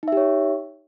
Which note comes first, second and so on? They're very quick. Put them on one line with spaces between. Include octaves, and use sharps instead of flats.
D#4 E5 G4 C#5